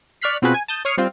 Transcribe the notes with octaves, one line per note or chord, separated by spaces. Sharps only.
D5 C#6 F6 F#6 B6 C7
B2 C4 F4 F#4 G#4 B4
G#5
A5 D#6 G6
C#5 C#6 D#6 F6 C7 C#7
G3 C4 F4